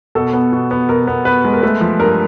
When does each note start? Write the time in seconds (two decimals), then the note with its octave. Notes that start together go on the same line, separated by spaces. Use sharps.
0.15 B2 A4
0.33 B3
0.52 B2
0.71 B3
0.89 B2 A#4
1.07 B3
1.25 B3 B4
1.45 G#3
1.53 A#4
1.63 A3 B4
1.81 F3
1.99 G2 A#4